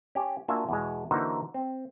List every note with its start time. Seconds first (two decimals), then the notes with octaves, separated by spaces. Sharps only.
0.15 C#4 G4
0.48 A#3 D4 F4 F#4 E5 G#5
0.69 E2 B2 G#3
1.11 D3 E3 A#3 D#4 F#4 C5
1.54 C4